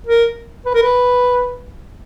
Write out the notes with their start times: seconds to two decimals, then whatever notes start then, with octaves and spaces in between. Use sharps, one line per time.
0.07 A#4
0.66 B4
0.75 A#4
0.83 B4